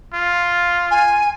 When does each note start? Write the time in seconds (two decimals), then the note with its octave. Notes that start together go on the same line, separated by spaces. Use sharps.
0.14 F4
0.91 G#5